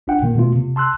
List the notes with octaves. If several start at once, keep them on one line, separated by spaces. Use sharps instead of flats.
A1 D4 F4 F#5 G5
A#2 D#3 A#3
B2 A3 B3 F4
C3
A5 C6 E6 F#6